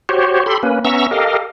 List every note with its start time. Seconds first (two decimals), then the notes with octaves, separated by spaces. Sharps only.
0.09 F#4 G4 C5 C#5
0.46 G4 A4 B5 C6
0.63 A#3 C#4 B4
0.85 B3 C#4 E5 A#5 C#6 E6
1.11 G4 A4 A#4 D#5 F5